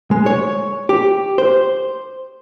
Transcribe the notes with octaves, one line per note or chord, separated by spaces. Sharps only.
G#3
C#5
G4
C5